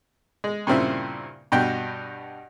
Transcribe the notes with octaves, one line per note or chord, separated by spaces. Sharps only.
G#3
G2 A#2 C#3 C4 E4
G2 B2 G5